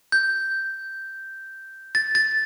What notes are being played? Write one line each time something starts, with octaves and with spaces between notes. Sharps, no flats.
G6
A6
A6